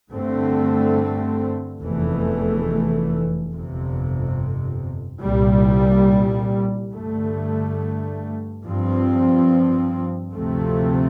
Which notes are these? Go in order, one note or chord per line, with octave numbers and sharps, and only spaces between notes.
G2 D3 A3 C4
F1 E2 E3 A3
G1 F2 C3
C2 A#2 G3
G2 D3 A3
G2 F3 C4
D2 C3 F3 A3 C4